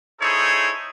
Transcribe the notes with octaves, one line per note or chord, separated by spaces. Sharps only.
D#4 E4 G#4 A4 C5 C#5